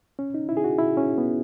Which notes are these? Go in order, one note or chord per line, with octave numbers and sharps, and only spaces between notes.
C#4
D#4
E4
G#4
F#4
E4
C#4
B3